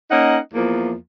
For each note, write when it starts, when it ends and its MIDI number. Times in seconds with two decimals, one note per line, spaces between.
0.11 0.37 58
0.11 0.37 61
0.11 0.37 63
0.11 0.37 75
0.11 0.37 78
0.54 0.92 40
0.54 0.92 53
0.54 0.92 58